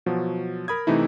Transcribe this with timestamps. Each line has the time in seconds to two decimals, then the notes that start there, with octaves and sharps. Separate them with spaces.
0.06 B2 F3 F#3
0.68 A#4 B5 D#6 G#6
0.87 C3 E3 A3 D#4 E4